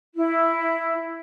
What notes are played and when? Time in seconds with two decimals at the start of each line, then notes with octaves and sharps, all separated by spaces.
0.15 E4